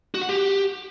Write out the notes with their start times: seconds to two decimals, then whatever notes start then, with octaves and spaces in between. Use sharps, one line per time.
0.14 F#4
0.22 F#5
0.29 G4